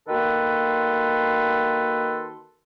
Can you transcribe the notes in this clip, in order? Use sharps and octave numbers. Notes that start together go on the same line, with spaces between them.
D#3 A#3 F#4 A4 B4 C6